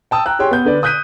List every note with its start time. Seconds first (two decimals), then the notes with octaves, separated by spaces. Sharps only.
0.11 G5 A5 D#6 E6
0.26 G5 A#5 F#6
0.39 G4 G#4 C#5 G5 C6
0.51 B3 G6
0.65 D3 B4 D5
0.83 D#6 F#6 G6 B6 D#7